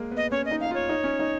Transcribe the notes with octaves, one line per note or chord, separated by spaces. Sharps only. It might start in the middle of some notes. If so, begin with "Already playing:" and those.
Already playing: G#3 A#3
B3
D#5
C#4 C#5
D#5
D#4
F5
D#4
F4 C#5
D#4
C#4
D#4